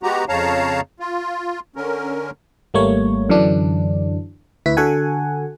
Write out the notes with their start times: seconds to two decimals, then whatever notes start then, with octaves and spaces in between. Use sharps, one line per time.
0.03 G#3 B3 F#4 G4 A#5
0.29 F2 C#3 C#5 F5 A5 A#5
1.00 F4
1.76 D3 C#4 A#4
2.74 G#1 G3 A3 A#3 C#5
3.29 F#2 D3 E3 F#3 D4
4.66 D2 E4 B4 B6
4.77 D3 F#4 A4 F#5 G#5